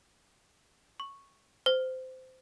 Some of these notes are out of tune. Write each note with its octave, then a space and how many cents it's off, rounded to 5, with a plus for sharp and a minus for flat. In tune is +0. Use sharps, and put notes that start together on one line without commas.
C#6 -5
C5 -20